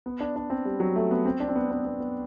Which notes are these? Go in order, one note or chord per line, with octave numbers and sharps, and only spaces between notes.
B3
D4
D4
C4
G3
F#3
A3
B3
C4
D4
C4
B3
B3
B3
B3